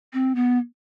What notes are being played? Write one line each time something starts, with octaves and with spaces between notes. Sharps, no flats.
C4
B3